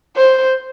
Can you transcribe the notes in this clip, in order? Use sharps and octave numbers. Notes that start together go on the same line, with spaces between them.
C5